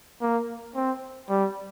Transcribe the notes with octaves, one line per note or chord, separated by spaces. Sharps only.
A#3
C4
G3